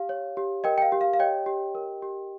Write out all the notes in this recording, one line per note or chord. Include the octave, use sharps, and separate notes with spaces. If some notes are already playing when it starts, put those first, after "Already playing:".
Already playing: G4 F5
C#5
G4
A#4 D#5 G5
G5
F5
G4
F5
F5
C#5 D#5 G5
G4
A#4
G4